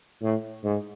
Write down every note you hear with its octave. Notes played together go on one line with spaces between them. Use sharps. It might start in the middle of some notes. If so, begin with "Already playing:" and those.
A2
G#2